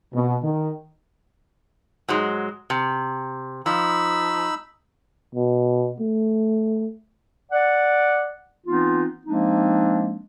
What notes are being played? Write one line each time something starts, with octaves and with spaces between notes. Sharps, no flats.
B2
D#3
G#2 F#3 G#3
C3
F3 D#4 B5 E6
B2
A3
D5 F#5
E3 B3 C4 D#4 F4
F3 G#3 A#3 C4 D4 D#4